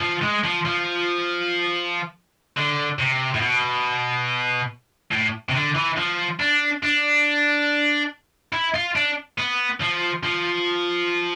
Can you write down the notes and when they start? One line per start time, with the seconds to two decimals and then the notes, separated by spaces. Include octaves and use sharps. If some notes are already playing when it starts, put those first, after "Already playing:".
0.01 F3
0.22 G#3
0.44 F3
0.65 F3
2.57 D3
2.99 C3
3.34 A2
3.41 B2
5.12 A2
5.49 C3
5.55 D3
5.75 E3
5.97 F3
6.40 D4
6.83 D4
8.53 E4
8.74 F4
8.96 D4
9.38 B3
9.81 F3
10.24 F3